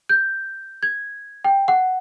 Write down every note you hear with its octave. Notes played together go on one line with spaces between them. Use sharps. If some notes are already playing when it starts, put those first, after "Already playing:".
G6
G#6
G5
F#5